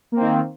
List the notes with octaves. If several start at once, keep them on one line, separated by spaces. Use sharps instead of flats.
D#3 A#3 C4